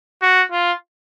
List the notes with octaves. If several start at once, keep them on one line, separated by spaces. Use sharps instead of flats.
F#4
F4